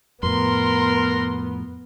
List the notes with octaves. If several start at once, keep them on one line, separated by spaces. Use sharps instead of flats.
F2 A2 B3 A#4 C6